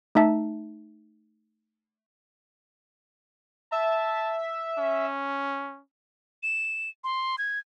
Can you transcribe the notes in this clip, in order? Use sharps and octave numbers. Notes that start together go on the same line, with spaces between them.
A3 D#4 E5 A5
E5 A5
C#4
E7
C6
G#6